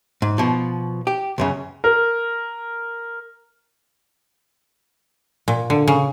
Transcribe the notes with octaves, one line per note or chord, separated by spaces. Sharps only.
G#2
B2 F3
G4
C#2 F#2 C#3
A#4
A#2
D3
C#3